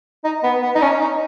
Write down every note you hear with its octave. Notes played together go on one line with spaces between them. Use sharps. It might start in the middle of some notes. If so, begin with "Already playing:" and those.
D#4
B3
B3
D#4
C#4
D#4